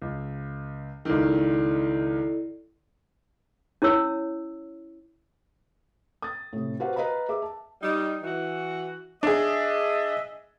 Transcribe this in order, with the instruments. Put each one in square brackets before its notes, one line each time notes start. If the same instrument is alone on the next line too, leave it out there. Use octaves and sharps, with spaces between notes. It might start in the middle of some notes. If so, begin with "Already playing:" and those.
[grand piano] C#2
[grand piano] C#2 D#3 [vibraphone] E4 A4 D5
[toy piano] C#4 E4 C#5 E6
[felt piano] D#6 A6
A2 C3
F#4 G4 B4 C5 F5 F#5
B4 D#5 F5 A#5 B5
G#4 E5 D6
A5
[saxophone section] G3 D#4
E3 F#4
[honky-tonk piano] D4 G#4 [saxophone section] D#5 E5